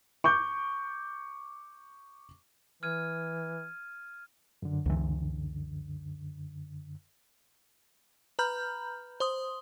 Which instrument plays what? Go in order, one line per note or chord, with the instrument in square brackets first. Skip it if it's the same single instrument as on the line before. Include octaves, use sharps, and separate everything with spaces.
[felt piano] C#6 D6 G6
[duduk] E3 [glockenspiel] F6 G#6 D#7
[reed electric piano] F#2 D3
[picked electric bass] C#2 E3
[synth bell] B4 A#5 B5 F6 G6
C5 C6 D#6